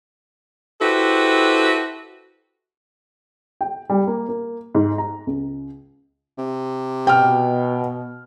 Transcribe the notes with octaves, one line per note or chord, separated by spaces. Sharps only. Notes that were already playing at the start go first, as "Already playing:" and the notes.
E4 F#4 G4 A4 B4 C5
G5
G3
A#3
A#3
G#2
A#5
C#2
C3
B2 G5 F6